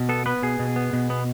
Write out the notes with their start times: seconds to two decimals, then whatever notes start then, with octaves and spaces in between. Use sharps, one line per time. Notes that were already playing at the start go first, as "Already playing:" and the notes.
Already playing: B2
0.09 B3 A4
0.26 B3 B4
0.43 B2 G#4
0.59 B2
0.76 B3
0.93 B2
1.10 B3